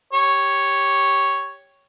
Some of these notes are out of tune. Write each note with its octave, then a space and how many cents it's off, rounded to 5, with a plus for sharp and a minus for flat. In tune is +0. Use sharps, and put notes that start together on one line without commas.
G4 +0 C#5 +0